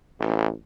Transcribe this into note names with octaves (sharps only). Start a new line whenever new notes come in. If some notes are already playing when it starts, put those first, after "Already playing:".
A1